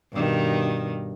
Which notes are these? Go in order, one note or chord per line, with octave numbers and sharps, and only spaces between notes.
G2 B2 D#3